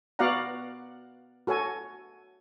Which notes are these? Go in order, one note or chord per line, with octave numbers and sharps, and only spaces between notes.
B3 F#4 D5 F5 F#5 A#5
F#4 A4 C#5 G#5